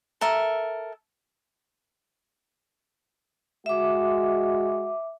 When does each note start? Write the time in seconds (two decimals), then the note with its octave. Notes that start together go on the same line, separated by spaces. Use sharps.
0.21 A4 A#4 E5
3.66 G#3 F#4 E5 D6